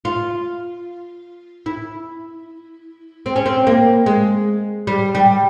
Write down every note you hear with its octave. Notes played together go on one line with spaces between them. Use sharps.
F4
E4
C4
C#4
C4
A#3
G#3
G3
G3